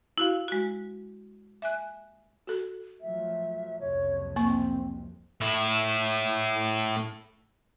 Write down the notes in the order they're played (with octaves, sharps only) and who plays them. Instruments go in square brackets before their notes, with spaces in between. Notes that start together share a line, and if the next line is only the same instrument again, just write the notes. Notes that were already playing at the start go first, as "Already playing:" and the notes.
[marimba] E4 F#4 F5
G#3 F#4
E5 G#5 F#6
[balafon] F#4 A4
[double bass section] F3 F#3 A3 [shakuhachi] E5
[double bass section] F#1 C2 F2 [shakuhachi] C#5
[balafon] A#3 C#6 [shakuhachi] C4
[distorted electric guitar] A2 E4